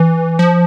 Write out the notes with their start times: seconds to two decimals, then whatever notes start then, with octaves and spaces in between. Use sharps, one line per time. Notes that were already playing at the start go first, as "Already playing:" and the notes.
Already playing: E3
0.39 F3